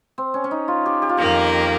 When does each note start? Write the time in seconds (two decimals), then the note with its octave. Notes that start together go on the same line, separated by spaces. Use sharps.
0.18 C4
0.34 C#4
0.44 C#4
0.51 D#4
0.68 F4
0.86 G4
1.02 G4
1.09 F4
1.17 F2 D#3 A#3 G4